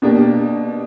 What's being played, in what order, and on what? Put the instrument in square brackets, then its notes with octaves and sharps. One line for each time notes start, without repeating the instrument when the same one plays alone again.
[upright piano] B2 A#3 D4 G4